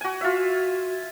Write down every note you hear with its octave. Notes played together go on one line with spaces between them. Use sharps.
F#4 G#5
F4 F#4 E5